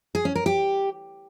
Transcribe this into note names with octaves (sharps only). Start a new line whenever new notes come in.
G#4
C#4
A#4
G4